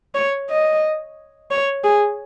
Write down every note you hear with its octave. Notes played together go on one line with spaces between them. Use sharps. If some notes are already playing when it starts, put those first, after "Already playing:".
C#5
D#5
C#5
G#4